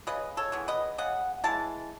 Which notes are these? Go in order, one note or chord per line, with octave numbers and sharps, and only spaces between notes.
C#3 B4 D#5
A4 C#5
E3 G#3 B3
B4 D#5
C#3 D#5 F#5
E3 G#3 A5